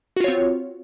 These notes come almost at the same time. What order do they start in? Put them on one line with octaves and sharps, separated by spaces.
F#4 F4 C#5 C4